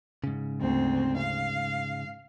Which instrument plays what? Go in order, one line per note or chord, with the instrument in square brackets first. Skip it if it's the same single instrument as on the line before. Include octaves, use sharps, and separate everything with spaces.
[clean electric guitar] G#2 C#3
[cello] D2 C4
F5